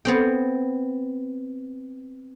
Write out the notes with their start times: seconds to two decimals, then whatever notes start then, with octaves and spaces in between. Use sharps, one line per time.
0.05 B3 C4 G5